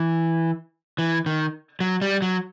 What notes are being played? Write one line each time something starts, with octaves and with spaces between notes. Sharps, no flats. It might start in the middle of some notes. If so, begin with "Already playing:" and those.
Already playing: E3
E3
D#3
F#3
G3
F#3